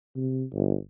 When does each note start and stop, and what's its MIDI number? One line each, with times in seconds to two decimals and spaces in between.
0.16 0.44 48
0.54 0.76 31